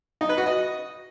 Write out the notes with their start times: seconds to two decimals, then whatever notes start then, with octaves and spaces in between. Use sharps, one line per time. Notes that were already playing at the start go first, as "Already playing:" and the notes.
0.21 D#4
0.29 B4
0.38 F#4
0.46 D#5